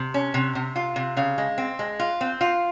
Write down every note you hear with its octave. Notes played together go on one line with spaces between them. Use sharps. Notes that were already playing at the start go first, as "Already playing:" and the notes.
Already playing: C3
C#4
C3
C3
F4
C3
C#3 F5
G#3
C4
G#3
F4
C4
F4